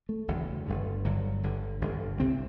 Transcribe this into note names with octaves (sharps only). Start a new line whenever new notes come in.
A3
F#1 E2 D3
G1 G2 D3
G1 G2 D3 F#3
G1 G2 D3
G1 G2 D3
C2 C3 C4